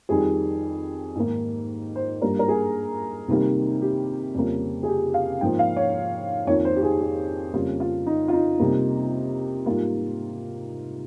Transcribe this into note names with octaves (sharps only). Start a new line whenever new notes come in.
F2 D#3 G3 G#4
G#2 D#3 A#3
C5
G2 G3 A#3 A#4
A#4
G#4
C3 D#3 G3 A#3
G4
F2 C#3 G3 A#3
G#4
G4
F5
G#2 F3 A#3 G5
F5
C#5
F2 D#3 A#3 C#5
C5
G4
G#4
G4
F2 C#3 G3 A#3 F4
F4
D#4
F4
D#4
C3 G3 A#3
G#2 G3 A#3 F4